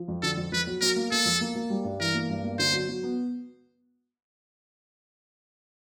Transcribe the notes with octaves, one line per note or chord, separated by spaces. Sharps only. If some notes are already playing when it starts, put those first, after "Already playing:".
Already playing: F3
F2
D3 A4
F2
F2 B4
F#3
F#3 A#4
A#3
A#3 A4
F2
A#3
A#3
G3
G2
E3 A#4
A#3
G2
A#3
D3 C5
F#3
F#3
B3